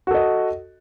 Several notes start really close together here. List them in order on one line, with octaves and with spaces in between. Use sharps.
F#4 A4 D#5